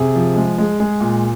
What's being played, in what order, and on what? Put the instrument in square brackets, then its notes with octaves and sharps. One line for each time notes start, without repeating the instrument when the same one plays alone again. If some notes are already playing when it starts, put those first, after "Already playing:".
Already playing: [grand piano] C3 G#4
F3
G#3
G#3
G#3
A#2